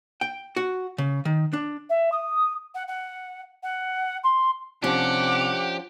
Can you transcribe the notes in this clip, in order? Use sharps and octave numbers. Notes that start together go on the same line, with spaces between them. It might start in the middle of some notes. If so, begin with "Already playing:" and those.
G5
F#4
C#3
D#3
D4
E5
D#6
F#5
F#5
F#5
C6
C3 F3 C#4 D4 G4 F#5 D6